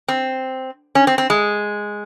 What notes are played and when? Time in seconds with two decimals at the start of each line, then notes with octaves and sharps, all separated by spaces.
0.08 C4
0.95 C#4
1.07 C4
1.18 C4
1.30 G#3